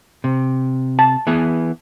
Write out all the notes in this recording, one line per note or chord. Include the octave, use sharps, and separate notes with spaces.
C3
A5
E3 B3 G#4